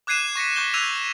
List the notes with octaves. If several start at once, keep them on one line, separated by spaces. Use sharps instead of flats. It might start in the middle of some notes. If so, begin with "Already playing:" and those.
D6 F#6 G#6 C7 D#7 E7
C#6 A#6 B6 C#7
C#6 G6 G7
D6 E6 F#6 G#6 D#7 F7